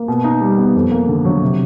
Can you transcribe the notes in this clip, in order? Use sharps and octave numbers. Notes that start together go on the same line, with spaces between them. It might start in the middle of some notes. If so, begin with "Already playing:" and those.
Already playing: A#3
B2
D#4
G3
B3
F2
A#3
D3
F#3
C3